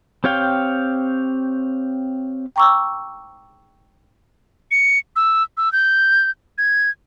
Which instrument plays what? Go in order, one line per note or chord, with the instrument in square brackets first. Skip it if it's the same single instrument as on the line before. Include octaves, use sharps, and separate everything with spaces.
[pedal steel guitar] C4 G4 C#5 F5 G5
[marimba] G5 A#5 C#6 D6 E6
[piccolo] C#7
E6
E6
G6
G#6